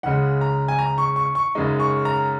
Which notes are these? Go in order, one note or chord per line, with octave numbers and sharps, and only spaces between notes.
C#2 C#3 G#3 F#5
A#5
G#5
A#5
C#6
C#6
C#6
F#2 C#3 G#3 D#4
C#6
A#5